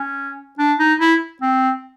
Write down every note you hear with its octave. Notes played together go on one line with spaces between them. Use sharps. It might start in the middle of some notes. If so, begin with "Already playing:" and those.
Already playing: C#4
D4
D#4
E4
C4